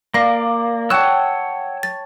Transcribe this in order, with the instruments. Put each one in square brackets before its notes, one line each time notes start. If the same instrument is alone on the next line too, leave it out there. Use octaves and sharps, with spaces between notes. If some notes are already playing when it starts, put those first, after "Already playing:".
[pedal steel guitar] A#3 [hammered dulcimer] D5 [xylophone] F5 A#6
[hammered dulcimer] C#5 G5 A5 [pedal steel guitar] F#5 E6 [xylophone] F#6 E7
[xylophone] A6